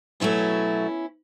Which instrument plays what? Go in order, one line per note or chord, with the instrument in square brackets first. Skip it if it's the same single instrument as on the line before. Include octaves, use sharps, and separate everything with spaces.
[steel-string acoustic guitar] B2 F#3 A3 C#4 E4